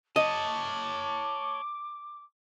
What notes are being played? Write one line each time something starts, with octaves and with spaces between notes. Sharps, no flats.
C#5 D#5 A5 D6